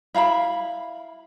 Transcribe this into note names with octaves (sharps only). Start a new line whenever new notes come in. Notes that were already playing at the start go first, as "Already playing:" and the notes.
E4 F5 A#5 B5